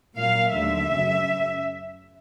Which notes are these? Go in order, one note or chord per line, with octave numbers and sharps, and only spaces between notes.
A#2 F#3 A#3 F5
D#2 D3 F#3 A3 E5
F#2 C#3 F#3